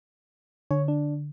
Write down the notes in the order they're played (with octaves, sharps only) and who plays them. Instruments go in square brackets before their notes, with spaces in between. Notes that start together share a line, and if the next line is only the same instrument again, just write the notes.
[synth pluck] D3 [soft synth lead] C#5
[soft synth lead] D4